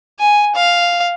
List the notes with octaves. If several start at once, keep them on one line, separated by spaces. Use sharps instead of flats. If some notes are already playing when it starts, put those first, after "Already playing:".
G#5
F5